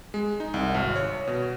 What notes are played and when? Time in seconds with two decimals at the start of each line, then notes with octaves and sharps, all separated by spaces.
0.14 G#3
0.40 D#4
0.54 C2
0.75 G#1
0.96 C#5
1.27 B2